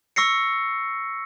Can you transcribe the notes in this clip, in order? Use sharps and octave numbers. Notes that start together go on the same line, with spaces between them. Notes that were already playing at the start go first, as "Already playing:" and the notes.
C#6 E6 A#6 C7 C#7